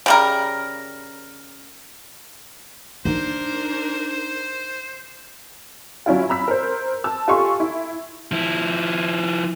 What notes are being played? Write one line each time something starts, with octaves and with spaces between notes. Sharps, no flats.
C#3 G3 A#4
D4 D#4 A#4 C5
F#3 C#4 E4 F4
A#5 B5 E6 B6
A#4 C5
A5 E6
F4 G4 A4 G#5 C6 C#6
E4
F3 E4